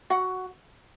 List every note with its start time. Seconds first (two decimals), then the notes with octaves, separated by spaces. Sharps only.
0.10 F#4 F#5